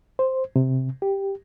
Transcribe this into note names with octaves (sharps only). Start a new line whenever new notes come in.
C5
C3
G4